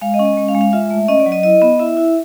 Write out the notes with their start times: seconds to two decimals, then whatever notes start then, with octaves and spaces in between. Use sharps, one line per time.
0.01 G#3 F5
0.14 D#5
0.19 C#4
0.25 D#5
0.37 G#3
0.48 F5
0.55 G#3
0.61 F5
0.73 F4 E5
0.90 A3
1.08 C#4 D#5
1.20 D5
1.26 F#3
1.32 D#5
1.43 E4 D#5
1.62 B3
1.79 E4 E5
1.97 E4